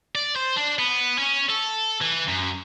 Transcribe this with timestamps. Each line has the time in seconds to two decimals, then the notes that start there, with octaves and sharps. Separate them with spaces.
0.15 D5
0.36 C5
0.56 D4
0.79 B3
1.18 C#4
1.50 A4
2.02 E3
2.29 F#2